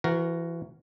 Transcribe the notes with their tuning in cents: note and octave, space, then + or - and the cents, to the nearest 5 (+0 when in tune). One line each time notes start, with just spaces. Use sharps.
E3 +35 F#4 +10 A#4 +0